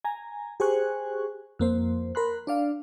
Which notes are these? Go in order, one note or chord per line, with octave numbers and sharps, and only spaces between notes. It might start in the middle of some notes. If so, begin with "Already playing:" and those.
G#5 A#5
G4 G#4 C5 G#5 C#6 F#6
F2 A#3 C5
A#4 B5 C6 F#6
D4 D5 F5